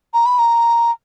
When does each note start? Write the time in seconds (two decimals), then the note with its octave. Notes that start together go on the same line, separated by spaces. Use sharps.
0.14 A#5
0.26 B5
0.39 A#5